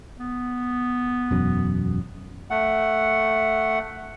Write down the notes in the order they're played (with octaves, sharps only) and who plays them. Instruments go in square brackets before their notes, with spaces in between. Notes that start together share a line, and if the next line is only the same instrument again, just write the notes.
[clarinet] B3
[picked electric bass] E1 F#2
[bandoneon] A3 F#5